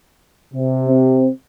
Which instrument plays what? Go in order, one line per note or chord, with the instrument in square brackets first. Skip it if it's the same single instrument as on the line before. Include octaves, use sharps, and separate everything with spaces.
[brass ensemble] C3
[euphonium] C4